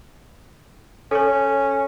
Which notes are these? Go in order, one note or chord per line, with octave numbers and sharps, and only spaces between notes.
C#4 A4 C#5